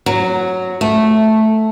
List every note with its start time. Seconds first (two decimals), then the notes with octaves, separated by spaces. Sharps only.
0.06 F#3
0.81 A3